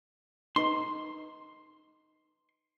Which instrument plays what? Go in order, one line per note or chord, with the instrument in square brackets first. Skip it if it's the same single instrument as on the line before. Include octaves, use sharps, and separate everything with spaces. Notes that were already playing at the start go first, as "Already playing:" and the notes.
[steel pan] D#4 B4 [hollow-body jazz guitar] C6